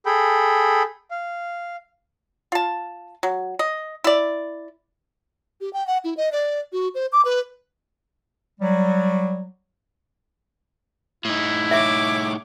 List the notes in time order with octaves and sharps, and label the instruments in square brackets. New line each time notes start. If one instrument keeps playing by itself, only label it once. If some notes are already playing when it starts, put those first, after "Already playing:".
[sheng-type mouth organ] G#4 A4 G5 B5
F5
[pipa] F4 A5
F#3
D#5
E4 D5
[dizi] G4
G5
F#5
E4
D#5
D5
F#4
C5
D6
B4
[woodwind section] F#3 G3
[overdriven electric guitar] A2 D#4 [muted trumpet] E4
[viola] C#5 D6 [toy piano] E5